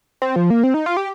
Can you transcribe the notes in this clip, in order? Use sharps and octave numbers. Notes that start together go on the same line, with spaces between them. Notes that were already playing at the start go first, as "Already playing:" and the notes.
C4
F3
A#3
C4
D#4
F4
G4